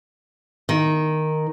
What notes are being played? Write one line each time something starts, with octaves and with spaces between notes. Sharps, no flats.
D#3